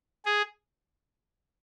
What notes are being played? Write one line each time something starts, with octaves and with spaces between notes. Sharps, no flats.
G#4